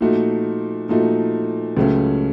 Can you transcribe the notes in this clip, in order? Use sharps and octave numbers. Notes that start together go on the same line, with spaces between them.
A#2 F3 A3 D#4 F#4
A#2 F3 A3 D#4 F#4
C#2 C#3 F#3 A3 C#4